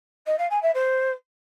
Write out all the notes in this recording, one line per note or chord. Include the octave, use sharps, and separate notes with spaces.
D#5
F5
G#5
E5
C5